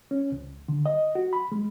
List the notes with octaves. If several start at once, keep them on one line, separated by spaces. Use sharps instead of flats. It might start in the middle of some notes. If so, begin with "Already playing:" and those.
C#4
C#2
D3
D#5
F#4
B5
G#3